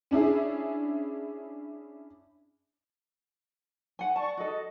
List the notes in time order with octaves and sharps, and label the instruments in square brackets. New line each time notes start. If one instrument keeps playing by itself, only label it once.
[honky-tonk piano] C#4 D4 E4 G#4
[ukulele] F#5 G#5
[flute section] D5 C#6 [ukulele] A5
[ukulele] F#4 A4 [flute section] D#5